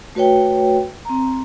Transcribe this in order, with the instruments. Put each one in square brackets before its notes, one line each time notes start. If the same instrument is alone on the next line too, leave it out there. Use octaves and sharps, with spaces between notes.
[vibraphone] A3 F#4 B4 C#5 G5
C4 A#5